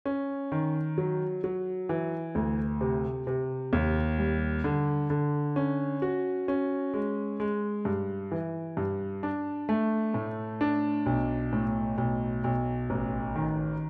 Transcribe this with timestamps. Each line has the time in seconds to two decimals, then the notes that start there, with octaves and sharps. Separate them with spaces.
0.06 C#4
0.52 D#3
0.98 F#3
1.44 F#3
1.89 E3
2.35 D2
2.81 C3
3.27 C3
3.73 D#2
4.18 G3
4.64 D3
5.10 D3
5.56 C#4
6.02 F#4
6.48 C#4
6.94 G#3
7.40 G#3
7.85 G2
8.31 E3
8.77 G2
9.23 D4
9.69 A3
10.14 A2
10.61 D4
11.06 B1
11.53 A2
11.98 B1
12.44 B1
12.90 A1
13.35 D#3